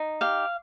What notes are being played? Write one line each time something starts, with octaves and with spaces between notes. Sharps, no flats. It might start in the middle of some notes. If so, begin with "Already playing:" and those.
Already playing: D#4
G4 F5